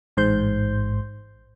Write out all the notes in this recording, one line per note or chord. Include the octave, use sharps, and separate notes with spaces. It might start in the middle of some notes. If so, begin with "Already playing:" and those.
A1 G#2 C5 C6 G6